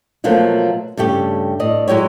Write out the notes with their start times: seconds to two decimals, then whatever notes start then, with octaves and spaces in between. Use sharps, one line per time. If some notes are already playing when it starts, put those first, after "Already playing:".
0.24 B2 F3 F#3 A3 A#3
0.97 G2 C#3 A3 G4
1.60 A2 D5 D#5
1.87 F#3 G#3 E4 G4 C#5